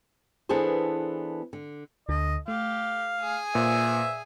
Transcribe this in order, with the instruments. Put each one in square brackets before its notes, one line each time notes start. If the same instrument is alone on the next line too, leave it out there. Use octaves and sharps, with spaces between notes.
[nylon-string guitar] E3 B3 D4 G#4 A4 C5
D3
[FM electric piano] D2 D3 [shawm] D#5
[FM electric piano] A3 [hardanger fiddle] G4 [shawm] F5
[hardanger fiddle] G#4 G#5
[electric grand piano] A#2 [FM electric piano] B4 C5 [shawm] E5